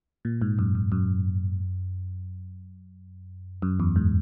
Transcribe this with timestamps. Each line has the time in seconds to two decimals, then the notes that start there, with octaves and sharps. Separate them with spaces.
0.25 A#2
0.42 G#2
0.59 F#2
0.75 F#2
0.92 F#2
3.62 F#2
3.80 E2
3.96 G#2